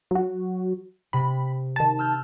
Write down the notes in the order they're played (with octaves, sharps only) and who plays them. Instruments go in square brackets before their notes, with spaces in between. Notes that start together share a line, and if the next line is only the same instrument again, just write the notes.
[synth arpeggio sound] F#3 F#4
[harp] C3 [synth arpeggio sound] B5
[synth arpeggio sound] D#3 A5
[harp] E6 F6 G6